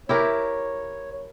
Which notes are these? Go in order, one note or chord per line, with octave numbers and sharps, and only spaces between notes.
E4 G4 A#4 C#5